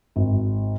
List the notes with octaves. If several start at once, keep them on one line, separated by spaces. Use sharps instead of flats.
G#1